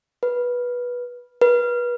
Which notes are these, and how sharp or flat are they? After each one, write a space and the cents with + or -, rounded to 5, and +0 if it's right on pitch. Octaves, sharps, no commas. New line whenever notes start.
B4 -15
B4 -30